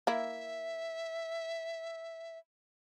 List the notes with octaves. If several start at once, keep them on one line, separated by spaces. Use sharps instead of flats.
A#3 E4 E5